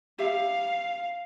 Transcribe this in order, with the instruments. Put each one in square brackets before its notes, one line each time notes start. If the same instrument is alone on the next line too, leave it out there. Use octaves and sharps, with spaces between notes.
[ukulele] G4 E5 [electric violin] F5